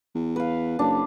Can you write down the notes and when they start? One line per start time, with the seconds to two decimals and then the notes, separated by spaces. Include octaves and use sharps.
0.15 E2
0.36 B4 F5
0.79 F#1 D4